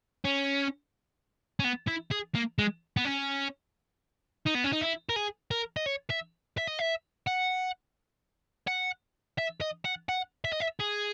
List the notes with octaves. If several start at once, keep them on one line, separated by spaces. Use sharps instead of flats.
C#4
C#4
B3
E4
G#4
A#3
G#3
B3
C#4
D#4
B3
C#4
D#4
E4
A#4
G#4
A#4
D#5
C#5
E5
E5
D#5
E5
F#5
F#5
E5
D#5
F#5
F#5
E5
D#5
E5
G#4